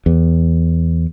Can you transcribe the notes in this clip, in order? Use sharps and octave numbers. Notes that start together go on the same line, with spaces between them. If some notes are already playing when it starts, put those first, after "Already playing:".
E2